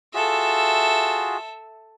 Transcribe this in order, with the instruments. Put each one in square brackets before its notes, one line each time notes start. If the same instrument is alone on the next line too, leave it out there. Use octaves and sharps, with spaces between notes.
[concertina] F4 F#4 G#4 [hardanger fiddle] A4 E5